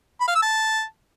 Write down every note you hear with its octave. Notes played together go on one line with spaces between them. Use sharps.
B5
F5
E6
A5